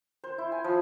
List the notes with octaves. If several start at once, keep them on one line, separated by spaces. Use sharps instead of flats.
C5
E4
G#5
F3